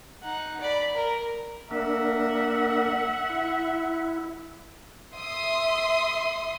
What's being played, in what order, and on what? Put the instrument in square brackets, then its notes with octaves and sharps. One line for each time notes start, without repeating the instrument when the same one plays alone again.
[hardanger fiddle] D#4 F#5
D5 B5
A#4
[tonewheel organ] A#3 D4 A#4 [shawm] E5 [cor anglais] F#5
[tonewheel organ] E4
[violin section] E5 C6 D#6